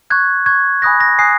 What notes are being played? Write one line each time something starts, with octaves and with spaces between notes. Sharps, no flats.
C#6 F#6 G#6
C#6 F#6 G#6
G#5 B5 D#6 F#6 A#6
A#6
G#5 B5 D#6 F#6 C7